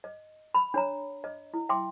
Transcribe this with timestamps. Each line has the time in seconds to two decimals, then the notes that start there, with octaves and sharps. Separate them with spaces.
0.04 D#5
0.54 B5
0.74 D4 C#5 A#5
1.24 D#5
1.54 E4
1.69 E5 G5 C6 D6